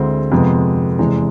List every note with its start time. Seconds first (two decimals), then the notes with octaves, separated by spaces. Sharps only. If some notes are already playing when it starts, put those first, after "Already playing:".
Already playing: D2 D3 G#3 C4 E4
0.32 F2 C3 G#3 B3
0.99 E2 C3 E3 G#3